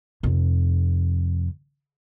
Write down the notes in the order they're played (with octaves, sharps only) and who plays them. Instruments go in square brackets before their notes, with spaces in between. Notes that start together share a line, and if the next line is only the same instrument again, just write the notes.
[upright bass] F2 C3